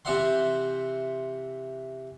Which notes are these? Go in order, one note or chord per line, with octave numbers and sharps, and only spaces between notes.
C3 E3 C5 E5 F#5 C6